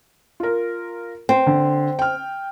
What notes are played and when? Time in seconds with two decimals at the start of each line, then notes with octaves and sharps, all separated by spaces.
0.40 F4 A#4
1.29 C4
1.47 D3
1.99 G5 F6